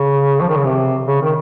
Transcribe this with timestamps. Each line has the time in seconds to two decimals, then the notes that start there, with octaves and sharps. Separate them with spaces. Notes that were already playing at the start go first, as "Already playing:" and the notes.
Already playing: C#3
0.41 F3
0.49 D#3
0.57 C#3
0.65 C3
1.07 C#3
1.22 D#3